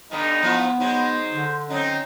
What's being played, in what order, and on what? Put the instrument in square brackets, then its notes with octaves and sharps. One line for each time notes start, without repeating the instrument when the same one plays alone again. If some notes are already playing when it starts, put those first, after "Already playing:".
[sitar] G2 D3 B3 [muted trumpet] D#4
[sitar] F3 E4 F4 [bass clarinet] B3
[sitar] F#3 G#3 F#4 [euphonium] D#4 [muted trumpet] C5
[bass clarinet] D3
[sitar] F#3 C4 [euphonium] C#4 [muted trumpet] D#4